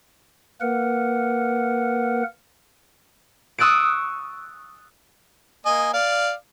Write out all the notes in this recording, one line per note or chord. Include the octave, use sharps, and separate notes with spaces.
A#3 A#4 B4 F#5
C#6 D#6 E6 F#6 A6 D7
A#3 D#5 G#5
D5 F5